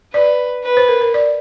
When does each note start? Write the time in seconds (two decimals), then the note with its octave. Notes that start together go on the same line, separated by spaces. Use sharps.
0.14 B4 D5
0.64 B4
0.77 C5
0.89 A#4
1.01 A#4
1.14 D5